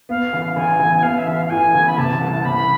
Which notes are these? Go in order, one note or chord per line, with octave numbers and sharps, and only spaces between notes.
B3 F5
A1
A1 G#5
A1
B3 F5
E5
A1
F5
F5
A2 G#5
A1
B5
C3 A5
C2
C3 B5